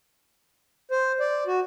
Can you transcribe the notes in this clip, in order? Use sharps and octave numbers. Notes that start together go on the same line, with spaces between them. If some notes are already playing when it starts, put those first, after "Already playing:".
C5
D5
F#4